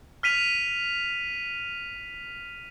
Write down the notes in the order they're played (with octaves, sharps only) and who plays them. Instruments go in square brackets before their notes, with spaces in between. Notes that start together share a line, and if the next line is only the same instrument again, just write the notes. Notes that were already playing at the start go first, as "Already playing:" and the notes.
[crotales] F6 B6 D#7 F7